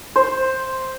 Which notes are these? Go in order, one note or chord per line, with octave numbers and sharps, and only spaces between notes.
C5